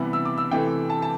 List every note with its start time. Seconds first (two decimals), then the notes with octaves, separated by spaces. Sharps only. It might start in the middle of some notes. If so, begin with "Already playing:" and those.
Already playing: C3 E3 G3 B3 E4
0.13 E6
0.25 D6
0.38 E6
0.51 C3 E3 A3 G5
0.90 A5
1.02 A5